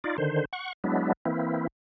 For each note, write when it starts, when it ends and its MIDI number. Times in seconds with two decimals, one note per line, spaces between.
0.04 0.17 63
0.04 0.17 65
0.04 0.17 74
0.18 0.45 50
0.18 0.45 51
0.18 0.45 72
0.53 0.73 78
0.53 0.73 85
0.84 1.12 54
0.84 1.12 56
0.84 1.12 59
0.84 1.12 62
0.84 1.12 64
1.26 1.67 52
1.26 1.67 58
1.26 1.67 60
1.26 1.67 64